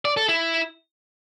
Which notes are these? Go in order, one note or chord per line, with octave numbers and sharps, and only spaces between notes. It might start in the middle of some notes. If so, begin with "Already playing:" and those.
D5
A4
E4